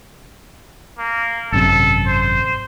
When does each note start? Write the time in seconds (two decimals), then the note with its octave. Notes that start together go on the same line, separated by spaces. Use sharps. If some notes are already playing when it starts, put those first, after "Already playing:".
0.98 A#3
1.52 G#1 F#2 C3 A4
2.07 C5